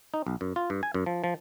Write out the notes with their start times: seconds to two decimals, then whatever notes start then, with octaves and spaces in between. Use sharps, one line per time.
0.14 D#4
0.27 B1
0.41 F#2
0.56 F4
0.70 G2
0.83 G#5
0.94 F#2
1.06 F3
1.24 F3